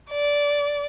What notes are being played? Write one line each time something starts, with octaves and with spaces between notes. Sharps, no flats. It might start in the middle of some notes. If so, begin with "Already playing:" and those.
D5